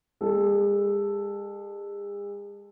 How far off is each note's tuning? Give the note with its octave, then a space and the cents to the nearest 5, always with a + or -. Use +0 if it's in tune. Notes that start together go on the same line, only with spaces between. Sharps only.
G#3 -40 A4 +0